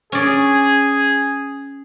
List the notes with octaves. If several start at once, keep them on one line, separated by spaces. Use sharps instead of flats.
C#4 G#4 D5